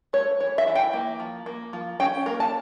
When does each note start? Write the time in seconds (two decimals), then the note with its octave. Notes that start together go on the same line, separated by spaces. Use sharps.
0.13 A3 C#5
0.40 E3 C#5
0.58 E5
0.67 E3
0.75 G5
0.93 A#3
1.20 F3
1.46 A#3
1.73 F3
2.00 C#4 G5
2.26 A#3 A#4
2.40 A5